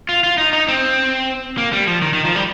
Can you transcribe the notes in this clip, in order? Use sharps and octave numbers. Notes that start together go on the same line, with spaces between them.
F4
F4
D#4
D#4
C4
A#3
G3
F3
D#3
D#3
F3
G3